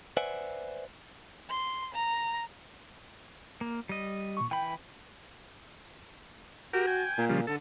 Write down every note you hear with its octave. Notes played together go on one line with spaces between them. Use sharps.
B4 C5 D5 E5 F#5 G#5
C6
A#5
A#3
G3 D#5
A#2 C#6
E3 G5 B5
F#4 G4 A#4
G5 G#5
A#2
C#3 F3 G3
D3 A4